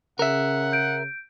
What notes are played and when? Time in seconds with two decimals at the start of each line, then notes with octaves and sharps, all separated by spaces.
0.19 C#3 A#4 E5 F#5
0.72 G6 D7